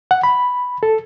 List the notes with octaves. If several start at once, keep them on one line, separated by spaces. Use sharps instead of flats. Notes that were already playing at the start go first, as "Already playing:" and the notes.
F#5
B5
A4